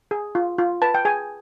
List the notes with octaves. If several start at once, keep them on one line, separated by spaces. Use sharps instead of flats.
G#4
F4
F4
B4 A5
G5
G#4 G#5